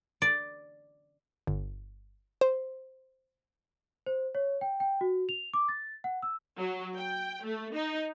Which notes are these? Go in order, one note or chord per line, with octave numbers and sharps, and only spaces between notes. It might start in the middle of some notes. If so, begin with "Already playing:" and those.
D5
G1
C5
C5
C#5
G5
G5
F#4
F7
D6
A6
F#5
E6
F#3
G5
A3
D#4